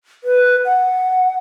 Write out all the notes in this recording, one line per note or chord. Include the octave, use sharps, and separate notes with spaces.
B4
F#5